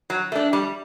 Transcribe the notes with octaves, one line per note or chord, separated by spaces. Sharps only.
F#3
A3 D4
G3